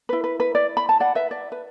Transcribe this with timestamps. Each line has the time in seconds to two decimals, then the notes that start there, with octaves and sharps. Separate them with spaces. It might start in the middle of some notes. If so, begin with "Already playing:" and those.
0.09 E4 B4
0.24 B4
0.40 B4
0.55 D5
0.77 B5
0.89 A5
1.00 D5 F#5
1.15 B4 E5
1.31 D5
1.52 B4